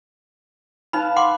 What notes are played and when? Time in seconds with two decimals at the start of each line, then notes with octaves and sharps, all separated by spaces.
0.93 D#4 B4 F5 A5 B5
1.16 F#5 C6 D6